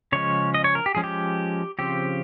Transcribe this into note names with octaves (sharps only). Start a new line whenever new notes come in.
C#3 F3 G#3 C#4 C#5
D#5
C#5
A#4
G4
F3 G#3 C#4 G#4
G4
C#3 F3 C4 G4